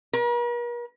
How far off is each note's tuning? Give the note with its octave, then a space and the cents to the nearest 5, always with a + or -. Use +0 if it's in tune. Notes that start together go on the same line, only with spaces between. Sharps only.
A#4 +45